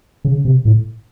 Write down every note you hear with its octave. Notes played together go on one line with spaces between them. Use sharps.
C#3
C3
A2